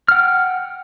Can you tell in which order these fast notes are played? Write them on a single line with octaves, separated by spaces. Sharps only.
F6 F#5 G5